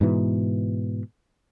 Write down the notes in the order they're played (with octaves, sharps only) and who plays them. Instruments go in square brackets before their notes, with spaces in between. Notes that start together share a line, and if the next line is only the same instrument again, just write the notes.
[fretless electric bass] G#2 B2 E3